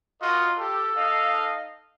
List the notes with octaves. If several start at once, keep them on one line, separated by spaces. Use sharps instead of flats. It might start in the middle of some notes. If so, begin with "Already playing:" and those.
F4 F#4 A#4 D#5
G4 A4
D#4 D#5 F5